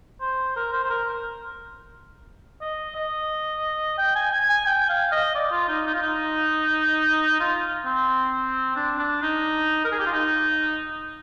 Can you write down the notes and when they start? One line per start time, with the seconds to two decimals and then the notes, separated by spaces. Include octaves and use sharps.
0.21 C5
0.57 A#4
0.73 C5
0.84 C5
0.90 A#4
2.61 D#5
2.96 D#5
3.98 G5
4.16 G#5
4.32 G#5
4.49 G#5
4.67 G5
4.89 F5
5.12 D#5
5.35 D5
5.51 F4
5.68 D#4
5.87 D#4
5.94 F4
6.01 D#4
7.40 F4
7.85 C4
8.76 D4
8.99 D4
9.23 D#4
9.85 A#4
9.92 G#4
9.99 G4
10.07 F4
10.13 D#4